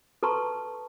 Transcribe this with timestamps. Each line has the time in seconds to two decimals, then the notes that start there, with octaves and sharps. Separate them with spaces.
0.23 A4 B4 A5 A#5 C6 C#6